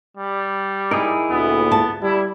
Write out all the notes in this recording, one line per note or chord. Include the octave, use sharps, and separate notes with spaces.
G3
D#4 E4 G#4 A#4
D2 A#2 B3
A5
G3 E4